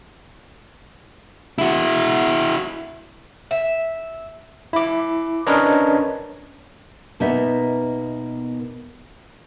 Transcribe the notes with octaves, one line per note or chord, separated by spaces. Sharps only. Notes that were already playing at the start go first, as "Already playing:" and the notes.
E4 F#4
E5
E4 D6
C#4 D4 A#4 B4 C#5 D#5
B2 A#3 B3 D#4 E5